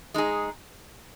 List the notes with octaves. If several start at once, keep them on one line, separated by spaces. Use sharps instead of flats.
G#3 D#4 G#4